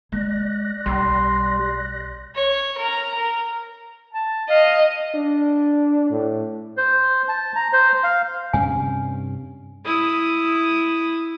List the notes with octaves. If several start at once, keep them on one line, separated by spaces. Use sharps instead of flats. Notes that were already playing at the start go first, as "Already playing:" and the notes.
G#3 D5 F#6 A#6
B1 G3 C6
C#5
A#4 A#5
A#4
A5
D#5 F5
D4
A2
C5
A5
A#5
C5
F5
G2 C3 C#4 G#5
E4 D#6